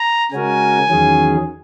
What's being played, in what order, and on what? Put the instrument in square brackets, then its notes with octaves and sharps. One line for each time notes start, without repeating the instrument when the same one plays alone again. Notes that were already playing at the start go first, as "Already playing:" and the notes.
Already playing: [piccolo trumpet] A#5
[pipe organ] C#3 G#3 C#4 F#4 A#4 [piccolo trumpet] G#5
[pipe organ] E2 D#3 F#3 C#4 G#4